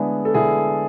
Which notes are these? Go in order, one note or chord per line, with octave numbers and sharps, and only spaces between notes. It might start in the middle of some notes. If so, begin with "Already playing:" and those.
Already playing: D3 G#3 B3 D4 E4 G#4
A4
D3 E4 G#4